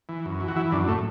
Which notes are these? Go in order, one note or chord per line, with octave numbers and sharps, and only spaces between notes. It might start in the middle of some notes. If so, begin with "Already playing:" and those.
E3
F#2
E3
F#4
E3 E4
F#2 D4
A2 A3